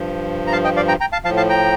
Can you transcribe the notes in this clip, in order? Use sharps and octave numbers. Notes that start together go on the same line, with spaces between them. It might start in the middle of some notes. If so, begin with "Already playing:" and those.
Already playing: G2 F3
A#5
F5 A5
D#5 G5
D5 F5
G5 A#5
G5 A#5
F5 A5
A2 F3 F5 A5
F5 A5
G5 A#5